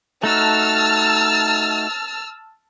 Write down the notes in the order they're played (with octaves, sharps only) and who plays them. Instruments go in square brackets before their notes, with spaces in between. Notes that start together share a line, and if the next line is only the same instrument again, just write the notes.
[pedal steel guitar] A3 D#4 F#4 [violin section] A5 E6 F6